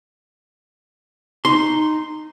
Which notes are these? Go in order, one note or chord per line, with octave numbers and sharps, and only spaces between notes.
D#4 C6